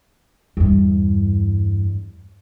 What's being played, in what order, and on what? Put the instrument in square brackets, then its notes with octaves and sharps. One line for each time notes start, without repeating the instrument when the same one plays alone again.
[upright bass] E2 G2